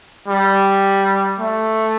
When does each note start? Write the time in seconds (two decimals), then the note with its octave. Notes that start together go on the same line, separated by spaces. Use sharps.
0.28 G3
1.40 A3